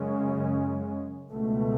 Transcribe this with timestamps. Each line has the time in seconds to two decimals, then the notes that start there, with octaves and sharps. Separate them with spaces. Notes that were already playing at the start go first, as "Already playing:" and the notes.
Already playing: F#2 C#3 G#3 C#4
1.31 C#2 B2 A3